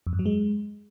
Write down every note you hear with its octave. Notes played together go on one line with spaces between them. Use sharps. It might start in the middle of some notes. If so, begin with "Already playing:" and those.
F2
G2
F#3
G#3